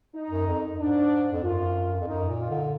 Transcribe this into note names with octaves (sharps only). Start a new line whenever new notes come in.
D#4
F#2
F2
G#2 D4
F2
F#2 F4
F2
F#2 D#4
A#2
F4
D3